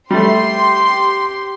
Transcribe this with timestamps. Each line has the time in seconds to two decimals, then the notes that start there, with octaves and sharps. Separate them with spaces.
0.11 G3 A3 G4 C6